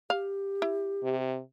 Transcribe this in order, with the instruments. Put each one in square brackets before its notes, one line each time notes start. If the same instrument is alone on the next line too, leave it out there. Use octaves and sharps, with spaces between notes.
[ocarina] G4 [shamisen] F5
[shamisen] E4
[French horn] C3